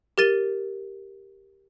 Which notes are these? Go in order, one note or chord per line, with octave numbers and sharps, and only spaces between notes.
G4 A#4 A6 D#7 G7